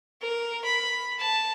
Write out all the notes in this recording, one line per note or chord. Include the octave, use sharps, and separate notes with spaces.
A#4
B5
A5